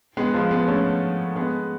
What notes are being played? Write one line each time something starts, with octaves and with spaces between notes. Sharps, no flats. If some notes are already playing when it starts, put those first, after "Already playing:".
G#3 B3
F3 G#3
G#3 B3
A3 C#4
G#3 B3